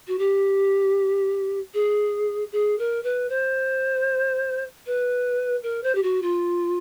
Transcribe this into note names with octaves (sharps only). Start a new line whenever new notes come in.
F#4
G4
G#4
G#4
A#4
B4
C5
B4
A#4
C5
G4
F#4
F4